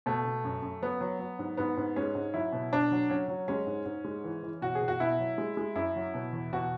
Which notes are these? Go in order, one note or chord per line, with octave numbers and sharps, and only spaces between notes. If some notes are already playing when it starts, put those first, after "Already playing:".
B2 A3
B2
F#2
F#2
F#3 B3
F#3
F#3
G#2
G#2 B3
G#2
G#3 C#4
G#2
F#3 E4
B2
B2 D4
F#3
F#3 C#4
F#3
G#3 C#4
G#2
G#2
G#3
E3
E3
B2 F#4
G#4
B2
F#4
B2 E4
F#3
G#3
G#3
F#2 E4
F#3
B2
E2
B2 F#4